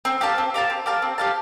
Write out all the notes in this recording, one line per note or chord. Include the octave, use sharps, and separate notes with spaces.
C4
G4 F5 A5
C4
G4 F5 A5
C4
G4 F5 A5
C4
G4 F5 A5